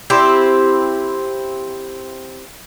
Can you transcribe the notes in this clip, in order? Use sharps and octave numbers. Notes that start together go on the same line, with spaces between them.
C4 E4 G4